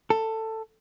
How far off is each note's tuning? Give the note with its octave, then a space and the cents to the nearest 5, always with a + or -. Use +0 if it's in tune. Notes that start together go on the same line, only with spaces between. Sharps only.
A4 +15